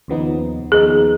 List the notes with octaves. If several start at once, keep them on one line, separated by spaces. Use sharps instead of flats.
D#2 C#3 F3 B3 D#4
D#2 C#3 F3 B3 D#4 G#4